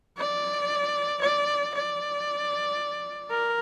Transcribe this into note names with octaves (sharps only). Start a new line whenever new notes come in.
D5
D5
D5
A#4